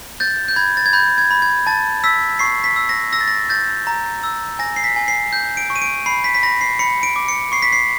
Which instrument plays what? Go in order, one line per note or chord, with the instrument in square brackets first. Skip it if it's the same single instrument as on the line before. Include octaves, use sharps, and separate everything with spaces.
[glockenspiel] G6 A6
G6
B5 G#6
A6
G#6
B5 G6
G#6
B5
G#6
A5 A6
E6 B6
C#6 C7
B6
E6
A#6
E6 A#6
A6
A#6
G6 A6
A#5
E6
G#5 A#6
C7
B6
G#5
C7
G6
D7
C#6
D#7
D7
B5 C7
B6
B6
B5 A#6
C7
B5 C#7
D7
D6
C#7
C#6 C7
B6
C7